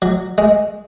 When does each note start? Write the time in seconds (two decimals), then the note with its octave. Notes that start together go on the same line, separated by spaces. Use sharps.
0.02 F#3
0.38 G#3